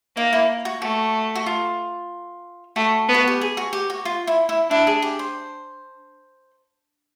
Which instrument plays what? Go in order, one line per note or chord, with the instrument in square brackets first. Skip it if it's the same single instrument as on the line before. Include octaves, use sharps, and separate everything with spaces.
[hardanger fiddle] A#3 [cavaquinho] D#4
[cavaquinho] E4
F#4
[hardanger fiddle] A3 [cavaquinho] F#4
[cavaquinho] F#4
F4
[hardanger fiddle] A3 [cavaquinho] F#4
[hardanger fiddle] B3
[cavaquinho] F#4
G4
G#4
F#4
G4
F#4
F4
E4
E4
[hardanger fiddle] D4 [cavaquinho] E4
[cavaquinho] G#4
G4
C5